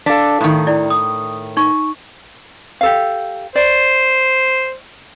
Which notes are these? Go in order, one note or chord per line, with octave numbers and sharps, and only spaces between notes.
D4 A4 F5 B6
A2 D#3
E4 D5
D#6
D#4 C#6
G4 A4 F5
C5 D5